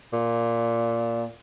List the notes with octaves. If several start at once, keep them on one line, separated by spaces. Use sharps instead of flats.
A#2